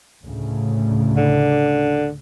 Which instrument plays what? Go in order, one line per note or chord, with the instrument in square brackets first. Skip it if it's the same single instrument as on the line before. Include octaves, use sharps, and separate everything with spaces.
[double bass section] D2 A2 C#3
[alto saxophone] D3